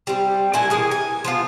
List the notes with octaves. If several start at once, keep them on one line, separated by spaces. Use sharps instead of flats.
G3 C4
A#2 D4 E4 G#5
E3 G#4 A#4 G#5
G#5
F3 B3 F4